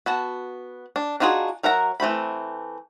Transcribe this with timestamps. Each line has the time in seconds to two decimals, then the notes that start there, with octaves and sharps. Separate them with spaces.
0.06 B3 F#4 A5
0.96 D4
1.20 D4 D#4 F4 F#4 G#4
1.63 F#3 A#4 E5 F#5 A#5
2.00 E3 A3 C4 B5